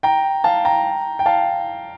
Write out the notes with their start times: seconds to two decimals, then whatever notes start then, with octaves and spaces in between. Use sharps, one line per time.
0.03 G5 A#5
0.44 F5 A5
0.65 G5 A#5
1.19 G5
1.26 F5 A5